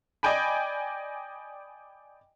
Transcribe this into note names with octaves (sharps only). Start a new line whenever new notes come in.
D5 D#5 G5 G#5 B5